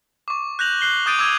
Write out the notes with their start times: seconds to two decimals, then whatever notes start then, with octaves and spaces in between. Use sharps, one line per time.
0.28 C#6 D6
0.59 F#6 G6 A#6 F7 F#7
0.81 F#6 C7 G7
1.06 D6 D#6 G6 A6 D7 D#7
1.19 D6 E6 G#6 D#7 G7